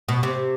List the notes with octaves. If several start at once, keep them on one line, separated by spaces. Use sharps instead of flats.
B2
C3